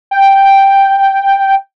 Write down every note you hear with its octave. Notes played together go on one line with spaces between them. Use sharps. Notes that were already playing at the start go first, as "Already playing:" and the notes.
G5